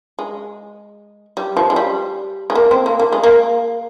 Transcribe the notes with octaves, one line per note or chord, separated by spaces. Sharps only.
G#3
G3
F3
G#3
G3
G#3
A#3
C4
A#3
A#3
G#3
A#3